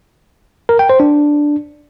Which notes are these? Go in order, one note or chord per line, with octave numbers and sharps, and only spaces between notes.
A#4
G5
C5
D4